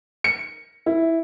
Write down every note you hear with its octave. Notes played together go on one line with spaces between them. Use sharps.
C#7
E4